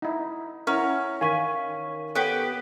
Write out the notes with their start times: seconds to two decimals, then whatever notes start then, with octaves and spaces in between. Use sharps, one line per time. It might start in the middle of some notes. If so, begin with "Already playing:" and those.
0.02 D#4 E4
0.67 C#4 E4 A#4 F#5 C#6
1.21 D#3 F5 G#5 C#6 B6 D#7
2.15 B3 G4 A4 C#5